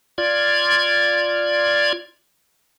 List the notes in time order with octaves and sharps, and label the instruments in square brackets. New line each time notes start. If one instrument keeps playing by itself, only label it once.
[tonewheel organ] F4 D5 G#6